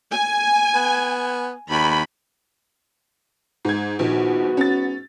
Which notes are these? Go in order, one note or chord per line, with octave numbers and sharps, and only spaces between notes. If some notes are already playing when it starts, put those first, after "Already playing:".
G#5
B3
D#2 B5
G#2 G#6
A#1 G#2 D#3 B3 F#4
C#4 A6